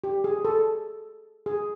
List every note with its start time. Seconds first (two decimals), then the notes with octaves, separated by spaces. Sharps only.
0.04 G4
0.24 G#4
0.45 A4
1.46 G#4